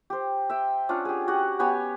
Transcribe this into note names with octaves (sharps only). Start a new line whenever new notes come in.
G4 C5
E5 G5
C#4 D4 F4 F#5
G4 G#4
F#4 G4 F#5
B3 G4 C#5 G#5